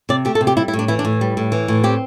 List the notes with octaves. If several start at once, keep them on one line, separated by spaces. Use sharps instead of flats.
C3 D5
A3 G4
A4
C3
G4
G3 E4
E4
A2
D4
E3 E4
D4
A2
G3
A2
E3
A2
C4 G4